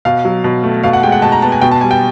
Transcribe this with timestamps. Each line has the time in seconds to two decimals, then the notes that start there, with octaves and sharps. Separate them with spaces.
0.05 B2 F5
0.25 F#3
0.44 B2
0.64 A3
0.83 B2 F5
0.93 F#5
1.03 G#3 G5
1.12 F#5
1.22 B2 A5
1.32 A#5
1.42 B3 A5
1.52 G#5
1.61 B2 G5
1.72 A5
1.81 G3 G#5
1.91 G5